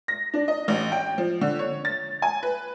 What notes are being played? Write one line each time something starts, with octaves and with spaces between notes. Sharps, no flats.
A#6
D4
D#5
A1
G5
F3
D3
C#5
A6
G#5
B4